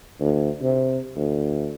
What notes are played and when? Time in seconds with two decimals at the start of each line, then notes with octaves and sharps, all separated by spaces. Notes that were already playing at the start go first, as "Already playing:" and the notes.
0.20 D2
0.63 C3
1.16 D2